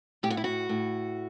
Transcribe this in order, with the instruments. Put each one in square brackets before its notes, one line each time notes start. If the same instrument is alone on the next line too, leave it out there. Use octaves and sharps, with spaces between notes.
[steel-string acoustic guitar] A2 G4
F#4
E4
F#4
A2